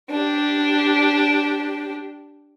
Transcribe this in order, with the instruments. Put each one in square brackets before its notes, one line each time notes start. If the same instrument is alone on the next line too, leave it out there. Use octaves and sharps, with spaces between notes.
[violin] D4 G4